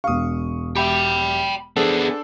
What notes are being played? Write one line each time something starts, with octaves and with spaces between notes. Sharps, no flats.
E1 F5 C#6 D#6
G4 E5 G5 B5
B3 D4 G#4 A4 C5